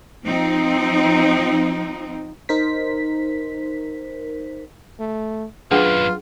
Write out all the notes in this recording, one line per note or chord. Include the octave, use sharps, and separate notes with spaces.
F3 C4 D#4
D#4 A#4 C5 B6
A3
B1 F#2 D4 F4 G#4 B4 F#5